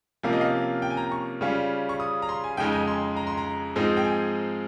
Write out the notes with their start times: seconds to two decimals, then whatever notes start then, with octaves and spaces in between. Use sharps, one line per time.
0.23 C3 F3 A#3 C#4 F5
0.33 D#5
0.41 F5
0.82 G5
0.90 G#5
0.97 A#5
1.12 C#6
1.41 C#3 G3 C#4 F4
1.89 C#6
2.00 D#6
2.22 A#5
2.29 C6
2.44 G#5
2.57 F2 C#3 G#3 D#4 G5
2.73 G#5
2.87 C6
3.17 A#5
3.27 C6
3.37 A#5
3.76 G#2 F3 G#3 C4 D#4
3.97 G5
4.05 G#5